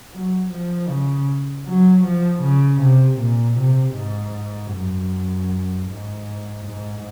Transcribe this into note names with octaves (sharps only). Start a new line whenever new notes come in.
F#3
F3
C#3
F#3
F3
C#3
C3
A#2
C3
G#2
F#2
G#2
G#2